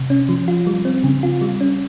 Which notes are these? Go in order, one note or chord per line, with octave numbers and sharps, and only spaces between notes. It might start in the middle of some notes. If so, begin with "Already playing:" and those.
Already playing: C3
C#4
F3
F4
G3
C4
C#3
F4
G3
C#4